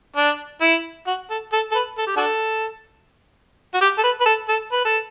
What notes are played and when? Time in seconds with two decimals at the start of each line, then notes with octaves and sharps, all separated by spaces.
0.16 D4
0.61 E4
1.07 F#4
1.30 A4
1.53 A4
1.72 A4
1.75 B4
1.98 A4
2.07 G4
2.17 D4 F#4 A4
3.74 F#4
3.81 G4
3.98 A4
4.03 B4
4.20 B4
4.26 A4
4.48 A4
4.72 B4
4.85 A4